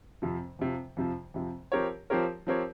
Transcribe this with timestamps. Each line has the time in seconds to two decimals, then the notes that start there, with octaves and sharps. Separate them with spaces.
0.22 F2 C3 F3
0.59 F2 C3 F3
0.97 F2 C3 F3
1.34 F2 C3 F3
1.72 F3 C4 G4 A#4 C#5
2.10 F3 C4 G4 A#4 C#5
2.47 F3 C4 G4 A#4 C#5